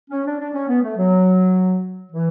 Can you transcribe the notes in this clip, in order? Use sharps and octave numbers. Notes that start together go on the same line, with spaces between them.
C#4
D4
D4
C#4
B3
A3
F#3
E3